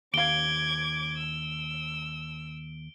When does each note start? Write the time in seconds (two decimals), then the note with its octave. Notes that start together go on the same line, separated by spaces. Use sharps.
0.14 D#2 F5 D6 G#6 D7 G7
1.18 E6